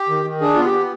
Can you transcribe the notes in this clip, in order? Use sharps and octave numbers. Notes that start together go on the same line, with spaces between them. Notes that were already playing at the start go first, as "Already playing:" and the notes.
Already playing: G4
D#3
D#3
D4 G#4
B3 F4
G4
B3